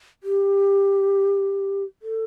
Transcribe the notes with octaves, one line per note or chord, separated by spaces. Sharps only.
G4
A4